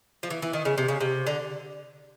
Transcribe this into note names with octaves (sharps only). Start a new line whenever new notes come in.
F3
E3
E3
D#3
C#3
C3
C#3
C3
D3